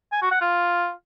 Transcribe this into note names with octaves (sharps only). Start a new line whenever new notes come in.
G#5
F#4
F#5
F4